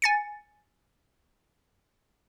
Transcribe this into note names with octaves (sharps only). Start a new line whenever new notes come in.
G#5 A6 C#7